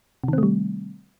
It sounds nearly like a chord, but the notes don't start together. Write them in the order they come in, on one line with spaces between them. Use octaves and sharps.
C3 D#3 C4 A3 G3